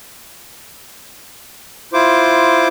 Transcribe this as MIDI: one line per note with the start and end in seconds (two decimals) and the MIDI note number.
1.93 2.68 64
1.93 2.68 65
1.93 2.68 72
1.93 2.68 86